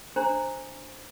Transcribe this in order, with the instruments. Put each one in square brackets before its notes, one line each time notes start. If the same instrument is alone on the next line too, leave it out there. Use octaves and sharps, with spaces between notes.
[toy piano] D4 C5 A#5